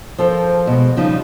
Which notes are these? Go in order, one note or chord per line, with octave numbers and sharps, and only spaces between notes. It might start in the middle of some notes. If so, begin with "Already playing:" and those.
F3 A4 A#4 C5
B2 G#3
C#3 F3 G3 D#4